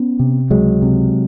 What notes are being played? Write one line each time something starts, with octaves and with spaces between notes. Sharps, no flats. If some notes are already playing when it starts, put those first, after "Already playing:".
Already playing: B3 C#4
C3
C#2 F#3 G#3
C3